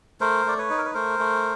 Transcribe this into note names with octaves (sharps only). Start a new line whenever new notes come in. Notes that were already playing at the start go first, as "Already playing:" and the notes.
A3 A#4 C5
A3 D5
B4 C#5
D#4
A#4
B4
A3 A#4 C5
A3